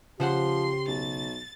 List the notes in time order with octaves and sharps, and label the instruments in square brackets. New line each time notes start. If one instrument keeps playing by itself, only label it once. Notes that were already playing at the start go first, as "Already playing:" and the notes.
[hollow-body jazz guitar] C#3 C5 F#5 [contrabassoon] F3 [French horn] G4 [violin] C6
[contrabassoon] B1 [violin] A6